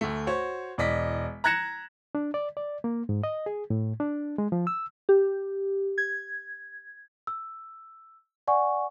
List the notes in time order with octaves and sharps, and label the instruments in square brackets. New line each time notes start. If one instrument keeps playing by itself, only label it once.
[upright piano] D2 A3
F#4 C5 C#5
E1 D5 D#5 B6
A#5 F#6 G#6 A#6 C#7 E7
[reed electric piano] D4
D5
D5
A#3
G#2
D#5
G#4
A2
D4
G#3
F3
E6
[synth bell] G4
G#6
[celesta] E6
D5 F#5 G#5 C#6